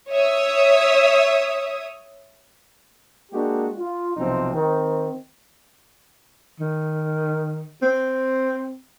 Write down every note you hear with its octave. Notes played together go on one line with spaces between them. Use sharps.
C#5 E5 D#6
G#3 A#3 D4 F#4 G4
F4
B1 C3 F3 C4 D#4
D#3 C4
D#3
C4